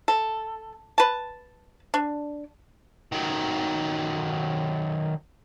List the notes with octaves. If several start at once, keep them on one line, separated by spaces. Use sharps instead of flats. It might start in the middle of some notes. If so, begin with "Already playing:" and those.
A4
B4 A5
D4
D#3 F#3